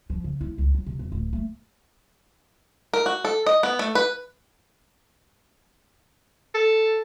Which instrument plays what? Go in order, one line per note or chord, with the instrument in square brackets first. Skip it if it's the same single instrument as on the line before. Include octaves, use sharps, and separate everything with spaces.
[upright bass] F3
C#3
E4
C#2
F#3
C3
E2
D1
A3
[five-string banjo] A#4
F#4
A4
D#5
B3
A3
B4
[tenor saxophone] A4